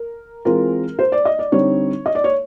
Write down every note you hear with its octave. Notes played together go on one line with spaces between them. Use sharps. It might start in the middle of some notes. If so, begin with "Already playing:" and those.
Already playing: A#4
E3 G#3 C4 F4 A#4
C5
D5
D#5
D5
D3 G3 C4 D#4 C#5
D#5
D5
C#5